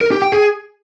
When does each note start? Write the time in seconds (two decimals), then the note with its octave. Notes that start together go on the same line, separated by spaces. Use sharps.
0.01 A#4
0.11 G4
0.22 G5
0.32 G#4